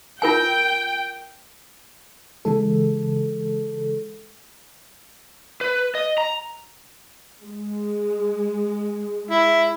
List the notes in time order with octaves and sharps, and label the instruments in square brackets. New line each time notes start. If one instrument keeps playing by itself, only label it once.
[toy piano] F4 A#4 G#5 [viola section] G5
[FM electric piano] C#3 E3 G#3 A4
[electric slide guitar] B4
D#5
A#5
[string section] G#3
[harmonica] E4